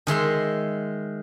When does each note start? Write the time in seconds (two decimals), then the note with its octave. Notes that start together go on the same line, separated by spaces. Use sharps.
0.07 D#3 G#3 E5 C6